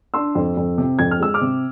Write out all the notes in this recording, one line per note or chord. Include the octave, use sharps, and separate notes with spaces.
D4 C6 E6
F2
F2
C3
F2 G#6
F6
G#3 E6
D6 F6
C3